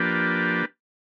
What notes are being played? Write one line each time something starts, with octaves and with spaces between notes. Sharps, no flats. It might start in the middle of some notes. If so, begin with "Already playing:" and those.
Already playing: F3 A#3 D4 G4 B4